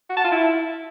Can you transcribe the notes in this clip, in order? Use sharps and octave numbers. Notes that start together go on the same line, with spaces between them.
F#4
A5
F4
E4